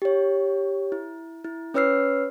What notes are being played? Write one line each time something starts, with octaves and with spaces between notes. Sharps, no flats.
G4 C#5
E4
E4
C#4 B4 C#5 E6 F6 C7